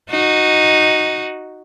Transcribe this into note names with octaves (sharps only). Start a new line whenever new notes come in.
D#4 F#4